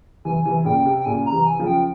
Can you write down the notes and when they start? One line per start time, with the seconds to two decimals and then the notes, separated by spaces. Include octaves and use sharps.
0.25 C3 E3 G#5
0.45 C3 E3
0.65 A#2 C#3 G5
0.86 C3
1.00 G5
1.05 A#2 C#3 G#5
1.26 A#5
1.32 C3 E3
1.45 G#5
1.59 C#3 F3
1.66 G5